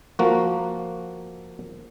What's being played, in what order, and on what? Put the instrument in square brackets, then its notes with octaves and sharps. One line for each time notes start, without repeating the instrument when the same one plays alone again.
[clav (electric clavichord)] F3 A#3 F#4